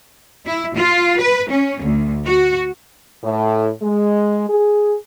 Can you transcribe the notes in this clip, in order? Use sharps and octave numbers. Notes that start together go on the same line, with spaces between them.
E4
F4
B4
C#4
D2
F#4
A2
G#3
G#4